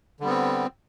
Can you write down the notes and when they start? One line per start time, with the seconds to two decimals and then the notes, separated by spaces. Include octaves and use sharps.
0.20 D3
0.23 G3
0.26 B3
0.29 C4